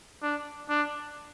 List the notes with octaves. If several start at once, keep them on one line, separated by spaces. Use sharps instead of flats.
D4
D4